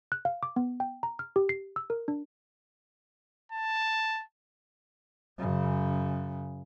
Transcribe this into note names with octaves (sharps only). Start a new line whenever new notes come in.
F#6
F5
D6
B3
G5
A#5
F6
G4
C7
E6
A#4
D4
A5
F#2 C#3